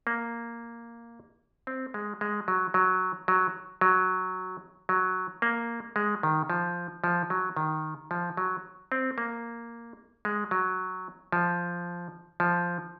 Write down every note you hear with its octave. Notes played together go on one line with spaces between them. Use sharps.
A#3
C4
G#3
G#3
F#3
F#3
F#3
F#3
F#3
A#3
G#3
D#3
F3
F3
F#3
D#3
F3
F#3
C4
A#3
G#3
F#3
F3
F3